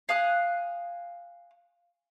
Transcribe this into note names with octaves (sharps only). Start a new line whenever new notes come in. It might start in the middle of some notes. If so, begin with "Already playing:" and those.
F5 G#5 D#6 F#6